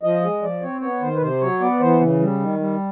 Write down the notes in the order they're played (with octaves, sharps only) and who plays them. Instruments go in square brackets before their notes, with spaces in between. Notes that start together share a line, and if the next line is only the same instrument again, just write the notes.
[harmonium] F3 D#5
G#3
F3 D5
C4 C#5
B3 C#5
D#3 C5
B4
C3 C5
F#3 C#5
B3 D5
E3 C5
C#3
G3
D#3
G3